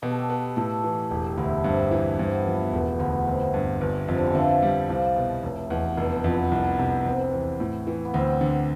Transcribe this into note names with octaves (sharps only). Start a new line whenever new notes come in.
B2 G4
A4
G4
B3
A2 A4
E3
E1 G4
D2 E4
G2 C4
E3
G2 C4
B3
F3 A3
B3
E1 B3
D2 B3
G1 C4
G2
G1
F2 C3
D3
E3
D3 F3
G3
C2 F3
B2
F1 A2
E2 B2
F1 D3
B3
F2
B3
C2
C3
F1 C4
E2
A2
E3
B3
D2 C4
D3